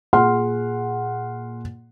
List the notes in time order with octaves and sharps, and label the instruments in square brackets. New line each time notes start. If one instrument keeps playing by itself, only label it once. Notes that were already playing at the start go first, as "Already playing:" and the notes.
[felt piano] A#2 G#4 F#5 C6 F6